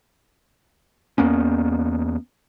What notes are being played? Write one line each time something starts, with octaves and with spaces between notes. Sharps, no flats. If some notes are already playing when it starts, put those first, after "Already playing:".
E2 A#3 B3 C#4